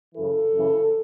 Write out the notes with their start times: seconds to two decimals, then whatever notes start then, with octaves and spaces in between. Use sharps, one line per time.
0.15 F#2 C#3 E3 A4
0.53 F#2 C#3 E3